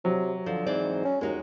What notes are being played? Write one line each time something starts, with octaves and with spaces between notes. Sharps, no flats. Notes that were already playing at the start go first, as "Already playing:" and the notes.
C3 F#3
D3 F3
G#2 E3 C4 D5
C#4
D#2 G#3 D#4 F#4